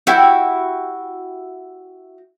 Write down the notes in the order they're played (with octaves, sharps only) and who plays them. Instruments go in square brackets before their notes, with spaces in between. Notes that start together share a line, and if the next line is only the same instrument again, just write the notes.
[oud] E4 F#4 G4